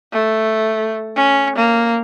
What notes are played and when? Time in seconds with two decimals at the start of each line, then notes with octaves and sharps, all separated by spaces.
0.13 A3
1.16 C#4
1.56 A#3